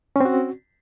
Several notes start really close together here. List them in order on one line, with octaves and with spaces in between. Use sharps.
C#4 C4 F#4